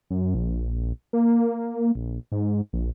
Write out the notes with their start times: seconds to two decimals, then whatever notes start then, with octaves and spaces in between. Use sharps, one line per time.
0.10 F#2
0.35 A#1
1.13 A#3
1.95 A#1
2.32 G#2
2.73 A#1